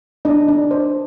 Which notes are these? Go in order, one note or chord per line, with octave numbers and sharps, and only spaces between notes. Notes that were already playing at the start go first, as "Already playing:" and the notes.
D4 D#5
D4
C5